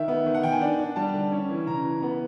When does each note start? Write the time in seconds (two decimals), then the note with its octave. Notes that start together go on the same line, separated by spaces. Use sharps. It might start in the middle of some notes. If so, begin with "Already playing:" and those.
Already playing: D#3 E5
0.08 B3
0.26 D#3
0.34 F#5
0.43 D#3 G5
0.52 G#5
0.61 D4
0.79 D4
0.96 G3 A5
1.14 D3
1.32 C#4
1.49 E3
1.67 C#3 A#5
1.84 E3
2.02 B3